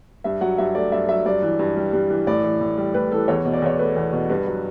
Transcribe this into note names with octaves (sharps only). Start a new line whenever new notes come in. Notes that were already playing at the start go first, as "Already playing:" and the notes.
G2 E5
F#3 F#5
G2 E5
A3 D5
G2 E5
F#3 E5
G2 D5
E3
G2
G3
G2
E3
A2 D5
E3
A2
G3
A2 B4
E3 A4
E2 C#5
B2
D5
E2 C#5
A3 B4
E2
B2
G2 B4
F#3